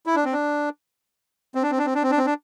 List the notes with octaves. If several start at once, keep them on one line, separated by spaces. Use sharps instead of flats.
E4
D4
C4
D4
C4
D4
C4
D4
C4
D4
C4
D4
C4
D4